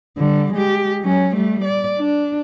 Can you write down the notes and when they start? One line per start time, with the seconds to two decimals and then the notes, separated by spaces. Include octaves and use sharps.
0.17 D3 G3
0.54 G#3 G4
1.02 F#3 C#4
1.35 G3 A3
1.64 D5
1.98 D4